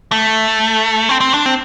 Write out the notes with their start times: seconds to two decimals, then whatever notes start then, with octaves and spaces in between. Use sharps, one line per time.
0.12 A3
1.09 C4
1.21 C4
1.34 D4
1.46 C4